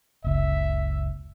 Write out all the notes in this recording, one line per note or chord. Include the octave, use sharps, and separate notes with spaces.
F#1 C#2 E5